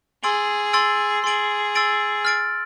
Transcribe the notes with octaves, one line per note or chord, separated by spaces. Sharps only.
G#4 C6 E6 A6 D7 F#7
C6 E6 A6 D7 F#7
G#4 C6 E6 A6 D7 F#7
C6 E6 A6 D7 F#7
F6 A6 D7